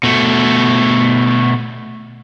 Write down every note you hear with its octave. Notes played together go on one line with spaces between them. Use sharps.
B2 A3